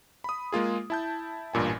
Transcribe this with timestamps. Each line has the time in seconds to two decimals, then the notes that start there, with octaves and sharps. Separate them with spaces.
0.24 B5 D#6
0.52 G#3 A#3 F4 G#4
0.90 E4 A5 G6
1.54 A1 G2 A#2 G#5